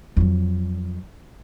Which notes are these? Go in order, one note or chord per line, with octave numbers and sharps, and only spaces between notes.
F2 F#3